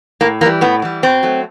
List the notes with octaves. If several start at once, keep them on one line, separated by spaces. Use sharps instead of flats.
A2 A#3
E3 G3 A#3
A2 B3
E3 G3
B2 C4
F#3 A3